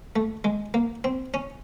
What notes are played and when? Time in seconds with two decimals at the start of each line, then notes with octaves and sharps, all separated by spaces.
0.16 A3
0.44 G#3
0.74 A#3
1.04 C4
1.34 C#4